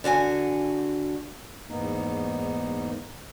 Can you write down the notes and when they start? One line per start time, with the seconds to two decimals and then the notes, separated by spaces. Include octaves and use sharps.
0.04 D3 F#4 F5 G#5
1.69 E2 G#2 A#3 B3 D#4